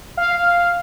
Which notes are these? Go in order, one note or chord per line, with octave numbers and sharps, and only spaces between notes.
F5